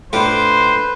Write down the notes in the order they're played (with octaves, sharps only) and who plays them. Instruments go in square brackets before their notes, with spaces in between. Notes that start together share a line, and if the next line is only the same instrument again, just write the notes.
[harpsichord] A2 F4 D6 [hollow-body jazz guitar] A3 D4 [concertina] B4 [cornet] C5